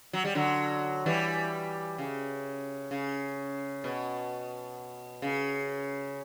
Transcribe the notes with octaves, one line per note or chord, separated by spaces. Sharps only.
F#3
G3
D3 F#3
E3 G3
C#3
C#3
B2
C#3